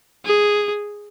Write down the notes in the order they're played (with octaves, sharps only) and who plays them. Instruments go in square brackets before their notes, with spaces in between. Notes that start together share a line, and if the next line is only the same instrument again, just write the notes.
[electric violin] G#4